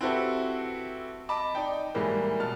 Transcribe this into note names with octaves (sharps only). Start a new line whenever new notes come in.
C4 E4 F#4 G4 A4 B4
D#5 A5 B5 D6
D#4 D5 G5
A2 E3 G3 G#3 A#3
B2 A5 F6